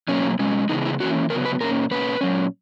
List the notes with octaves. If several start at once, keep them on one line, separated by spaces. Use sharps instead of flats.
B2 F#3 A#3 C#4
B2 G#3 C#4
C#3 E3 G#3 B3 D#4
E4
E3 A#3 C#4 F#4
C#3 F#3 B3 A#4
B4
A#2 A#3 C#4 A#4
B2 A#3 C#4 B4
A#2 F#3 C#4